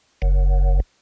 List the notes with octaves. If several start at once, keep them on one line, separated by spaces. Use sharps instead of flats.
F#1